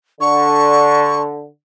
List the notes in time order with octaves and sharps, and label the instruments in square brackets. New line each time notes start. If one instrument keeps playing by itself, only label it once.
[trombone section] D3 [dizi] C#6